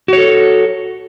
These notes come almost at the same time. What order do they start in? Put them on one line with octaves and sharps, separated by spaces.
F#4 C#5 A4